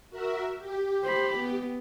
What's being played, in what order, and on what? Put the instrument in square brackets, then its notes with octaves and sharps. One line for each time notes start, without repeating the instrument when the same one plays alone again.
[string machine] F#4 A#4 E5
G4
[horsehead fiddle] C5 B5
B3